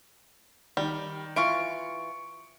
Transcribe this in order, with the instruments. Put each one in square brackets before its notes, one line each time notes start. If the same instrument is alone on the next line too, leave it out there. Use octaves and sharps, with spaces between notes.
[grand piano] D#3 [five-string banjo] G3
[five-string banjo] E3 F4 [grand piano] C#6 D7